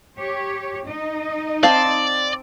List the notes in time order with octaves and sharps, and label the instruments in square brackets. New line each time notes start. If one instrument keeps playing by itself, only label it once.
[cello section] G4 C#5
D#4 D#5
[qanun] C4 A5 C6 [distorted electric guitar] D5 [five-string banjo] F5